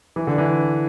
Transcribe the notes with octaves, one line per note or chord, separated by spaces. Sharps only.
E3
D3
E3